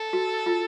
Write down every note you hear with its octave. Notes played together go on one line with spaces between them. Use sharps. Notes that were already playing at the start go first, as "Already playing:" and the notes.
Already playing: A4
F#4
F4